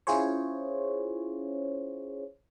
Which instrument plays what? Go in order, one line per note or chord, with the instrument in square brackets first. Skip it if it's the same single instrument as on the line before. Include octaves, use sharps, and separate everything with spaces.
[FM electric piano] C#4 E4 F4 G#4 C5 C#5